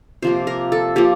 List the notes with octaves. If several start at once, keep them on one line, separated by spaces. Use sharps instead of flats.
C3 F3 A#3 C5
A#4
A4
F3 A#3 G4